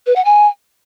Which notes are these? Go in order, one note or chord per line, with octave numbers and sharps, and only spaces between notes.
B4
F#5
G#5